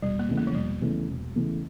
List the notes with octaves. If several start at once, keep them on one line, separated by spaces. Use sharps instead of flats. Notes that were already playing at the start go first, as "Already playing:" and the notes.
E1 G3
A#3
E2 C#3 E3 A3
A#3
F3
E1 G3
E2 C#3 E3 A3
E1
E2 C#3 E3 A3